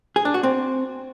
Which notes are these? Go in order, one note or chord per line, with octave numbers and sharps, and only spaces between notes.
G#4
D4
F#4
C4